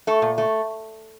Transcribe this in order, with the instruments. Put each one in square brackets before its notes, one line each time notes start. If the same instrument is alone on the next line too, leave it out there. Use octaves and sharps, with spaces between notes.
[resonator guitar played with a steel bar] A3 A4
A#2
A3